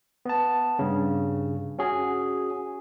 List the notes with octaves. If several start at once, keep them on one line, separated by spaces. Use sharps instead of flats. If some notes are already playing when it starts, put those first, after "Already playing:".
B3 A5
G2 C#3
C#4 F#4 G#4